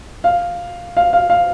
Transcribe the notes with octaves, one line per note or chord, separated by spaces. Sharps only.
F5
F5
F5
F5